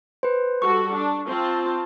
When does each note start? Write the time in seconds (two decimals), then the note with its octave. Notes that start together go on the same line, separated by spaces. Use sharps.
0.23 B4 C5
0.62 G3 F#4 A4 C#6
0.95 D4
1.28 C4 F4 A5